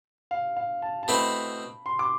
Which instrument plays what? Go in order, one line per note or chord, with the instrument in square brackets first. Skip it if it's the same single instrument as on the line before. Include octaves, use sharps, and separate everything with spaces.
[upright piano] F5
F5
A5
A5
[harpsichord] B2 A3 C4 E4 [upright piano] B5
[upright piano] C6
D6